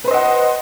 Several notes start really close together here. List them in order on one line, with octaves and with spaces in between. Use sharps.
B4 C5 D#5 F#5